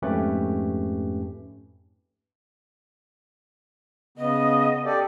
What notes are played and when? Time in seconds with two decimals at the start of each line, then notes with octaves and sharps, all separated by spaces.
0.02 F2 G#2 A3 C#4 G4 B4
4.18 C#3 B3 D#5
4.85 G4 A4 D5